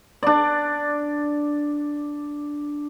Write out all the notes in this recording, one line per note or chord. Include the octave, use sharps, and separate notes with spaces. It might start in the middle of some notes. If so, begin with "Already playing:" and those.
D4 D5